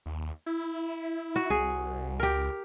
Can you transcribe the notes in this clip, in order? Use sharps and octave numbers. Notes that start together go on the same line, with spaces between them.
D#2
E4
F#4
C2 G#4
C#2 G4 A#4